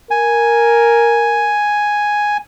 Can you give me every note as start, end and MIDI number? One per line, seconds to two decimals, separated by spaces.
0.11 1.56 70
0.11 2.37 80